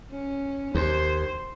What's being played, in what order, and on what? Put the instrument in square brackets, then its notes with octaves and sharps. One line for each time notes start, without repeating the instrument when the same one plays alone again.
[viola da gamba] C#4
[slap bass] D#2 [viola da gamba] C5